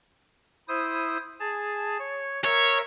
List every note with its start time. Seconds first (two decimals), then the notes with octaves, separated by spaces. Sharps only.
0.68 E4 C5 D#6
1.40 G#4 A5
1.98 C#5
2.44 A#4 C#5 E5